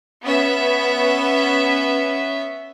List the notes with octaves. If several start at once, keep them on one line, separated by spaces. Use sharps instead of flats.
B3 C#4 E5